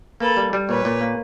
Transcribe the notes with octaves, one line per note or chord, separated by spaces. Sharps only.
A#3 A4 B4
G3
G3
A#2 B4 C#5
A#2
A#3